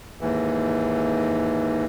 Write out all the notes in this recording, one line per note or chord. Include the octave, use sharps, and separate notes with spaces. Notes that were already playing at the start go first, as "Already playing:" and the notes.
D#2 G#2 E3